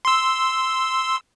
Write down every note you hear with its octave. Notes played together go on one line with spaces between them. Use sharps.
C6 E6